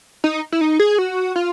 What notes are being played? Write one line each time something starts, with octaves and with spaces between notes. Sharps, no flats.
D#4
E4
D#4
G#4
F#4
F4